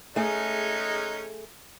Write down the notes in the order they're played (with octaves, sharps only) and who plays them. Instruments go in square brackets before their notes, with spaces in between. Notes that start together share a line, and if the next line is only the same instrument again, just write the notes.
[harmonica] G#3 C#4 D#4 [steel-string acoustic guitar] A3 G#4